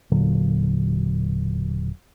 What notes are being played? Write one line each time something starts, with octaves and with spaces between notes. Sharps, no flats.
E1 A#2 D3 F#3